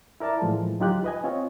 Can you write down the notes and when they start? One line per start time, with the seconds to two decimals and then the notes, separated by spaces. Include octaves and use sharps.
0.20 E4 A#4 D5 A5
0.42 A2 E3 F3 G#3
0.79 D2 F#3 D#4 F4 G4 F#6
1.04 B4 D#5 G#5
1.24 C4 F4 C#5 D#5